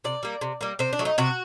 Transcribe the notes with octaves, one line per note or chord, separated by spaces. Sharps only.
C3 D5
G3 A#3
C3
G3 A#3
C3 C5
D4
F#3 A3
D#4
C3 F#4